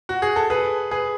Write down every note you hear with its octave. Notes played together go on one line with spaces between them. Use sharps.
F#4
G#4
A4
G#4 B4
G#4 B4